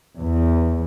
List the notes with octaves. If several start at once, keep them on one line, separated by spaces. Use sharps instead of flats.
E2